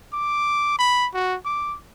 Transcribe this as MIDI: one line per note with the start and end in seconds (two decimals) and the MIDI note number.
0.13 0.76 86
0.79 1.08 83
1.14 1.36 66
1.45 1.77 86